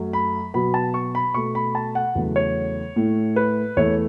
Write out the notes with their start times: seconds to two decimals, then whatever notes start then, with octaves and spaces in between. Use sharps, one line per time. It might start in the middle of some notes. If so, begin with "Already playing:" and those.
Already playing: F#2 F#3 A3
0.13 B5
0.54 B2 F#3 B3 B5
0.74 A5
0.94 C#6
1.15 B5
1.34 B2 A3 C#6
1.55 B5
1.75 A5
1.95 F#5
2.15 E2 C#3 F#3 A3
2.36 C#5
2.96 A2 A3
3.36 B4
3.77 E2 E3 A3 C#5